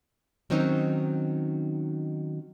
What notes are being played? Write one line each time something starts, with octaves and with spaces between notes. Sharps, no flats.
D#3 F#3 C4 C#4 D#4